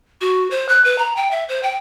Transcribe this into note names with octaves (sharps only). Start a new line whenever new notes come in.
F#4
C5
F#6
B4
A#5
G5
E5
C5
G5